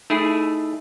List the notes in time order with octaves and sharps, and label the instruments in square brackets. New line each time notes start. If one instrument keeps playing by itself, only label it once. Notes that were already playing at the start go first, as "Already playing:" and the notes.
[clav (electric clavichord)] A3 E4 G#4 [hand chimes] D#4